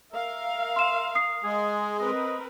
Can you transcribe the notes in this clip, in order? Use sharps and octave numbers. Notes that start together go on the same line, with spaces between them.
A#4 E5 F5
C6 E7
D#6 C7
G#3 G#4
C4 A#4 B4 D#5